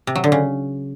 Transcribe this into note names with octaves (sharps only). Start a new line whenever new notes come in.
C3
F#3
D3
C#3